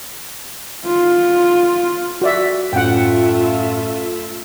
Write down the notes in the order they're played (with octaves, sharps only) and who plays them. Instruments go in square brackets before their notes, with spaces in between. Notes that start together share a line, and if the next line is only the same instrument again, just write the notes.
[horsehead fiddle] F4
[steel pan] F#4 D5 E5
[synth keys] F#2 A2 C#4 [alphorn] A3 [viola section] F4 E5 [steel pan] F#5 G5